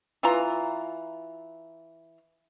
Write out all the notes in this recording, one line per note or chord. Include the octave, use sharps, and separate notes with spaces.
E3 F4 A#5